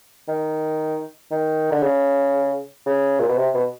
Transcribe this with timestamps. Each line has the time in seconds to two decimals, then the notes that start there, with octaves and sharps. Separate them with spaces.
0.28 D#3
1.31 D#3
1.71 D3
1.83 C#3
2.86 C#3
3.20 A#2
3.29 B2
3.37 C3
3.54 B2